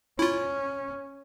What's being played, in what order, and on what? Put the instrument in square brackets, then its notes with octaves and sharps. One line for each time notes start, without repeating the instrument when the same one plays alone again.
[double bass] C#4 [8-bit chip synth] E4 F4